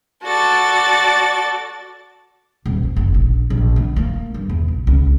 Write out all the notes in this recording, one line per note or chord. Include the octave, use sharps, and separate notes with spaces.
F#4 A4 D5 A6
D#1
D#2
F#1
A#1
A#1
D3
A#3
G2
E2
A#1
C#2